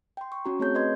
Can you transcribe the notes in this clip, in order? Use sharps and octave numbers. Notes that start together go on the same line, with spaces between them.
G5 C6
C#6
C#4 F#4 A#5
A3 C4 G#4 C#5 A5 G6
B4 D#5 C6 G#6